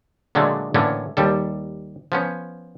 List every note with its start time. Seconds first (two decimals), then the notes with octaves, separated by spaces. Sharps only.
0.35 A#2 D3 F#3 G#3 A3
0.74 A2 D3 E3 A3 A#3 C#4
1.17 D#2 G3 A4
2.12 F3 B3 C#4